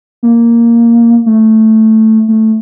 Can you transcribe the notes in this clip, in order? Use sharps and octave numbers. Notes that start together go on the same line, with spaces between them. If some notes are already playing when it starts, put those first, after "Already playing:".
A#3
A3
A3